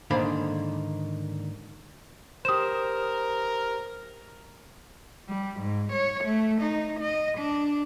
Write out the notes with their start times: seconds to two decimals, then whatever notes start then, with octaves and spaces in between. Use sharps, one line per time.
0.11 G#2 D3 D#3 A#3 C5 B5
2.45 G4 A#4 C5 D#6 E7
5.28 G3
5.60 G#2
5.92 C#5
6.25 A3
6.61 D#4
7.00 D#5
7.38 D4